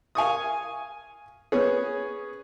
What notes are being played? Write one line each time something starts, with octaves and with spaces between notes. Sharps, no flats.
F5 G#5 C#6 D#6
B3 C#4 G#4